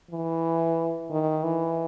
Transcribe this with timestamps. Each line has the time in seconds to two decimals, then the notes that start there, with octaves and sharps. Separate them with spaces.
0.11 E3
1.11 D#3
1.44 E3